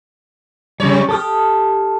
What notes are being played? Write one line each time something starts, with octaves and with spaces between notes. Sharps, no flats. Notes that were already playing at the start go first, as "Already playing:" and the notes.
F2 C#3 G3 C#5
G4 A4 D#6 F6